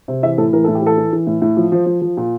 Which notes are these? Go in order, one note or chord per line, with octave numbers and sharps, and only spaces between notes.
C3
E3 E5
A2 A4
E3 A#4
A2 A4
G4
E3 A4
E3
E3
A2
A2
F3
F3 C5
F3
F3
A#2